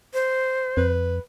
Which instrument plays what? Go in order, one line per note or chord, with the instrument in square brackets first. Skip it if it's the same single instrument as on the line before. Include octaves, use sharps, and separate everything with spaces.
[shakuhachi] C5
[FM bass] F2 [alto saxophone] B4